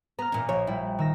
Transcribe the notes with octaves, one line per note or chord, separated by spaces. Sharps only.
B3 A#5 F6
E2 A#2
A#1 C#5
G3 E4
D#3 E6 A#6